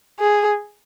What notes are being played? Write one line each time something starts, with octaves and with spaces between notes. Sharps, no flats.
G#4